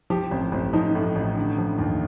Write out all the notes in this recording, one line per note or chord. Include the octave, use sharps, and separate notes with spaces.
F3 G4
A1 C4
A1 C4
F3 D#4
A2
A1
D3
F3
D#2